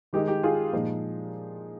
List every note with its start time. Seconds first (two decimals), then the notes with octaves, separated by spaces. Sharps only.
0.13 D#3 G#3 D#4 G4
0.28 G4
0.43 F4 G#4
0.73 A#2 F3 G#3 D#4